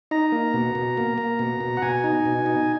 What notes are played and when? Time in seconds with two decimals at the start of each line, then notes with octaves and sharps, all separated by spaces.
0.11 D#4 A#5
0.32 A#3
0.54 B2
0.75 B2
0.97 A#3
1.18 A#3
1.39 B2
1.60 B2
1.77 F#5
1.82 B2 G#5
2.04 D#4
2.25 B2
2.46 D#4